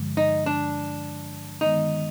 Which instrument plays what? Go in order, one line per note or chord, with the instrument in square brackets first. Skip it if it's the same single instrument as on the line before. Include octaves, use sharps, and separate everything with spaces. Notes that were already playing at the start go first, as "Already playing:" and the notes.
Already playing: [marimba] G2 D3 F3 G#3
[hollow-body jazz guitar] D#4
D4
[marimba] D#3 G#3 B3 [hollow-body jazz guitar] D#4